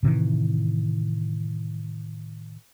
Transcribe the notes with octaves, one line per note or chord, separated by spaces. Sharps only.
A2 C3 D#3 E3